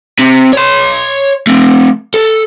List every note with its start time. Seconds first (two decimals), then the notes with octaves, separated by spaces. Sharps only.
0.19 C3
0.53 C#5 C6
1.47 A3 C4
2.14 A4